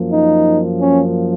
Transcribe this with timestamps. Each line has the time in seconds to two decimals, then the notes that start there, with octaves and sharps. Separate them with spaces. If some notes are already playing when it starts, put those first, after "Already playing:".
Already playing: F#2 F3 A#3
0.09 D#4
0.78 C#4